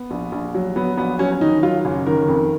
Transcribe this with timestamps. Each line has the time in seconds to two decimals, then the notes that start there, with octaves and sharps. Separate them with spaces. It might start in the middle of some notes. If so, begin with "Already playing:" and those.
Already playing: B3
0.11 A#1
0.32 A#1
0.54 F#3
0.76 F#3 B3
0.97 A#1 B3
1.19 F#3 C#4
1.32 C#4
1.41 D#3 D#4
1.63 F#3 F4
1.85 F#1 C#4
2.06 D#3 A#4
2.28 F2